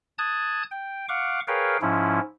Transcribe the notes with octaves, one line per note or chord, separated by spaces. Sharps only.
A5 D#6 F#6 G#6
G5
F5 F#5 C#6 D6
G#4 A#4 B4 C#5 F5 G5
G#2 F3 C#4 E4